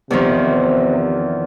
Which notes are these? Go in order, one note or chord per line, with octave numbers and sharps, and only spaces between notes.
E2 C3 D#3 F3